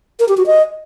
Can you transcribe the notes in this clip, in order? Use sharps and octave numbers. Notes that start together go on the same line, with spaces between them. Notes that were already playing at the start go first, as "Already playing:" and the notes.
A#4
G4
F#4
D#5